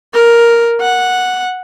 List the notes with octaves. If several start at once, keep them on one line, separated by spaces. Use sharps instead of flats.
A#4
F#5